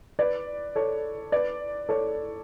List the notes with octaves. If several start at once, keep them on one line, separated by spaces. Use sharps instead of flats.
B4 D5
A4 C#5
B4 D5
A4 C#5